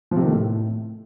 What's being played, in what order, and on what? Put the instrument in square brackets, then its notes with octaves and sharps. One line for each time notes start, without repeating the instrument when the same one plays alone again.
[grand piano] F3
C3
D#3
A3
A2